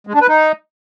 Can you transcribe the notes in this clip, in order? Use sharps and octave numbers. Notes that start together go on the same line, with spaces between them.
G#3
D4
B4
D#4